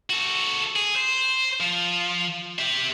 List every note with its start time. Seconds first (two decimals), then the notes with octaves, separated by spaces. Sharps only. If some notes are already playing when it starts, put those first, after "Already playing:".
0.10 F#4 A4
0.76 G#4
0.96 C5
1.60 F3
2.59 G4 E5